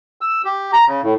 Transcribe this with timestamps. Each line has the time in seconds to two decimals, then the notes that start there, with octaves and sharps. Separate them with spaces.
0.21 E6
0.45 G4
0.73 A#5
0.87 C#3
1.03 A2